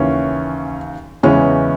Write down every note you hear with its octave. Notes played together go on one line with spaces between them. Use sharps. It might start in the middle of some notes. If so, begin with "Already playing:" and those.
Already playing: D#2 C#3 E3 C#4
E2 C#3 E3 G#3 C#4